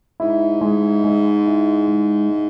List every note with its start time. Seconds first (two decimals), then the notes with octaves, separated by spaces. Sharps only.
0.20 G#2 E4
0.61 G#3
1.04 G#3
1.46 E4
1.88 G#3
2.29 G#3